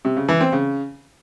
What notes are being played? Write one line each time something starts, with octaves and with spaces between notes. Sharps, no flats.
C3
C#3
E3
C4
C#3